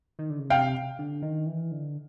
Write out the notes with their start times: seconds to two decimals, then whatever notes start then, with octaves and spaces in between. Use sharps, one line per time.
0.19 D#3
0.30 D3
0.39 C#3
0.49 C3 F5 G5
0.99 D3
1.22 D#3
1.46 E3
1.72 D3